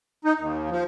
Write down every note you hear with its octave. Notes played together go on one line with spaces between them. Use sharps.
D#4
D#2
F3